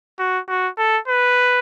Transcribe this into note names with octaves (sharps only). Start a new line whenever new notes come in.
F#4
F#4
A4
B4